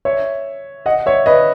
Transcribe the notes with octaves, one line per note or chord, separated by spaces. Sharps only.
C#5 E5
D#5 F#5
C#5 E5
B4 D#5